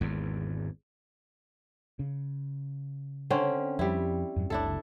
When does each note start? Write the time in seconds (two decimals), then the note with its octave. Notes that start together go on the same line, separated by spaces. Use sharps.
0.01 G#1 E2
1.99 C#3
3.30 D3 C4 C#4
3.79 F2 G3 E4
4.36 F2 G#2 F#3
4.50 F#1 C#2 C#3 D4 E4 A4